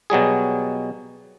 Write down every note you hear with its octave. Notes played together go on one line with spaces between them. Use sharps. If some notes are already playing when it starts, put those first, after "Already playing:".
B2 F#3 G3 G#4